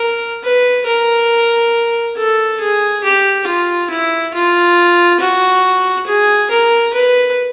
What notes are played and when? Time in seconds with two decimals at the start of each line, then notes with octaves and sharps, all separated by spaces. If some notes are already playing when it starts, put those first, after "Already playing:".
Already playing: A#4
0.43 B4
0.86 A#4
2.16 A4
2.60 G#4
3.03 G4
3.47 F4
3.90 E4
4.34 F4
5.20 F#4
6.07 G#4
6.50 A#4
6.93 B4